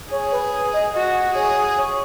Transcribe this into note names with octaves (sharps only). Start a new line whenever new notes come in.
G#4 C#5
B4
D#5
F#4 D#5
G#4 C#5
C#5